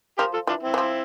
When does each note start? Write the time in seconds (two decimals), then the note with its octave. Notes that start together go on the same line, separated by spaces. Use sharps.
0.18 F3 G4 A#4
0.33 F4 A4
0.47 E3 D4 F4
0.63 C4 E4
0.74 E3
0.78 F3